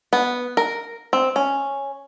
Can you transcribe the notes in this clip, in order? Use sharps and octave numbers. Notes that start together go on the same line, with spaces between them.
B3
A#4
C4
C#4